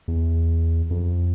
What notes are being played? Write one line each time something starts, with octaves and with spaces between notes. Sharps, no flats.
E2
F2